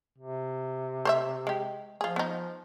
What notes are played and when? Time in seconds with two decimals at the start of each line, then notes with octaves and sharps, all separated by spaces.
0.18 C3
1.05 C5 C#5 E5
1.47 G#3 G4
2.01 F3 F4 G#4
2.16 B3 D#4